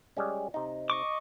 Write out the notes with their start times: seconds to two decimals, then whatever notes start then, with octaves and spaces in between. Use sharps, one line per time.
0.17 G3 G#3 C#4
0.54 C3 D#4
0.90 D#5 C#6 D6